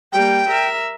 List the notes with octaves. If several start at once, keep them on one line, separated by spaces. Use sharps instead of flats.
G3 A#3 G5
A#4 E5